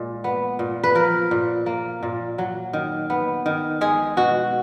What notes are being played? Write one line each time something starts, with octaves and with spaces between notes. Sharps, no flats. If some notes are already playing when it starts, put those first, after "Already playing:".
Already playing: A#2 G#3
B3
A#2
B4
F3 A#4
A#2
A#3
A#2
F#3
D#3
B3
D#3
G#3 G#4
B2 F#4